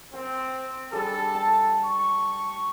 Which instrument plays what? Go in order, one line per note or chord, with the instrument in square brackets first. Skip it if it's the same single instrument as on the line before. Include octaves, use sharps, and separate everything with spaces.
[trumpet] C4 [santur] G5 E6
[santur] G3 D4 G#4 [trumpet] A4
[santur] A5
[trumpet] C#6